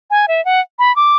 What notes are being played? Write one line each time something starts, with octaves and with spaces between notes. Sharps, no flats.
G#5
E5
F#5
B5
D6